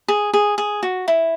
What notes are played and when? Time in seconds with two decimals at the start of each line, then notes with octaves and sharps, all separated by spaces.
0.08 G#4
0.34 G#4
0.58 G#4
0.83 F#4
1.08 E4